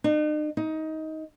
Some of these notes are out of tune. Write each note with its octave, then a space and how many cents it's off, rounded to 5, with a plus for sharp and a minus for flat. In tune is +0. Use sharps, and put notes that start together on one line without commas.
D#4 -45
D#4 +20